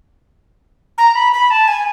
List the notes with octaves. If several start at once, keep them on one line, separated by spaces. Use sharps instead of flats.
A#5
B5
B5
A5
G#5